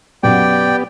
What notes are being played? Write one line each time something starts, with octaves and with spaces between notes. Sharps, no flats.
F#2 B2 B3 G4 D5 F#5 G5